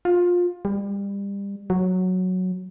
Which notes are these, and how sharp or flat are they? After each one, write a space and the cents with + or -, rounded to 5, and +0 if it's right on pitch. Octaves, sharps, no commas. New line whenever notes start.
F4 +20
G3 +30
F#3 -5